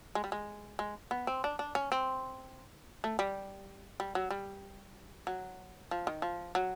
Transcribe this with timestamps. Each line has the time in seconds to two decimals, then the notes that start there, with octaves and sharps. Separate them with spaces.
0.15 G#3
0.24 G3
0.32 G#3
0.79 G#3
1.11 B3
1.27 C4
1.44 D4
1.59 D4
1.75 C#4
1.92 C4
3.04 A3
3.19 G3
4.00 G3
4.15 F#3
4.30 G3
5.27 F#3
5.91 F3
6.07 D#3
6.22 F3
6.55 F#3